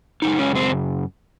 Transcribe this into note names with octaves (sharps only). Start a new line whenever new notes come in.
F#2 C#3 G#3 D#4
C#4
C4